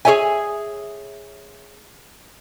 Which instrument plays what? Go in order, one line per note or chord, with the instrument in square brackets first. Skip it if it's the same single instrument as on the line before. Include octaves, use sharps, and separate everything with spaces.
[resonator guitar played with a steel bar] G#4 A4 C#5 E5 G#5